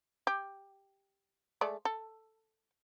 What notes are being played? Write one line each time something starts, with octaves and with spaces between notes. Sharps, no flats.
G4
G#3 A3 D5
A4